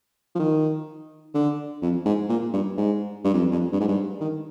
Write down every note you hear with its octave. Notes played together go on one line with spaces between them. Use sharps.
F3
D#3
D3
F2
G#2
A#2
G2
G#2
G2
F2
F2
G2
G#2
G2
D#3